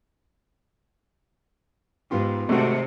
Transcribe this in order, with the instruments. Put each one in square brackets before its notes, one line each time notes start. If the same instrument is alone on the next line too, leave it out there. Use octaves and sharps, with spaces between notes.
[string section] G#2 [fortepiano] B3 F4 G4
[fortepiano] G#1 C4 E5 [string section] C3 [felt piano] A3 F#4